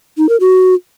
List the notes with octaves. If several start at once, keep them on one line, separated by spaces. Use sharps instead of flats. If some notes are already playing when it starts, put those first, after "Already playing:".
D#4
A#4
F#4